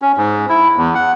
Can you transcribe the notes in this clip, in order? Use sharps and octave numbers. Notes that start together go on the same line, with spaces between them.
C#4
G#2
E4
E2
F#5